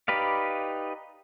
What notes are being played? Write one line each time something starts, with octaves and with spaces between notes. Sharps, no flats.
D#4 G4 B4 D5 F5